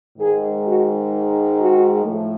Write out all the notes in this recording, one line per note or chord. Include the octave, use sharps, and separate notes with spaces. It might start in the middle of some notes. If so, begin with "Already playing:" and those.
G#2 D#3 G#3 G#4
F#4
F#4
A2 F3 A3